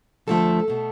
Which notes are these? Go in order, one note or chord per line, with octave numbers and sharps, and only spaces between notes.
D2 D3 F3 A3 A4
B2 A3